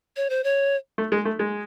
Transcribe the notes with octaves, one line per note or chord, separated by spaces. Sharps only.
C#5
C5
C#5
A3
G#3
A3
G#3